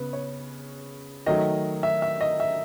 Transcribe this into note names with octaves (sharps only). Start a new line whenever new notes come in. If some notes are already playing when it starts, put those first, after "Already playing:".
Already playing: C#3 B3 B4
C#5
D#3 F#3 A3 D#5
E5
E5
D#5
E5